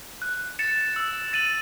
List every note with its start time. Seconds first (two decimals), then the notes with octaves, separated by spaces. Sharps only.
0.22 F#6
0.59 A6 C#7 E7
0.96 E6
1.33 A6 D#7 F#7